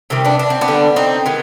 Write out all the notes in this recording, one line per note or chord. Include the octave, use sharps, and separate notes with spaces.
C3 D#3 G3 C4
B3 D4
D4
C4
B3 D4
D3 G3
C4 D#4
D#3 G#3 B3